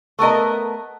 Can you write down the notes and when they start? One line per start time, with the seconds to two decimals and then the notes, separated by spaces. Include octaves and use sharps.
0.19 A3 B3 A#4 D#5